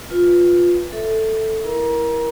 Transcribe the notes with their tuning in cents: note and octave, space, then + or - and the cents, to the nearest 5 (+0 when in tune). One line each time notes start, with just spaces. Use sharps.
F4 +10 B4 +0
A4 +5 E5 -5
E4 +0 A#4 +20 A#5 +30